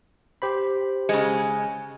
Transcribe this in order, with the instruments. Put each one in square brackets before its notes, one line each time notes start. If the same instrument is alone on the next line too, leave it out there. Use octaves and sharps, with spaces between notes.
[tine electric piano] G4 C5 B5
[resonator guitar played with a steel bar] C#3 G#3